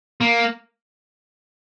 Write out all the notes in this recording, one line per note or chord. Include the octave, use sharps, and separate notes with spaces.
A#3